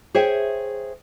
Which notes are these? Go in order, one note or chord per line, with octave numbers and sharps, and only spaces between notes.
G#4 C5 C#5 E5 G5